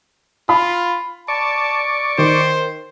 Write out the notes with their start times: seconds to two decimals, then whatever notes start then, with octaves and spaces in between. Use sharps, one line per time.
0.49 F4 B5
1.28 D5 A5 C#6
2.18 D#3 C5